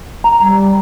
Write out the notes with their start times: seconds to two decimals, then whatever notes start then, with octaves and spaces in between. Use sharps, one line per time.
0.24 A#5
0.41 G3